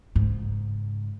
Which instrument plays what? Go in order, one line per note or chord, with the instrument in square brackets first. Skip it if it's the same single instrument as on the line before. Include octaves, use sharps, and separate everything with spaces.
[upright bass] G#2 C#3